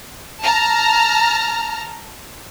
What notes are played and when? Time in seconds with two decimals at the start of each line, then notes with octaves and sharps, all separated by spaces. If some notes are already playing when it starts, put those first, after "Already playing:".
0.42 A5 A#5 F6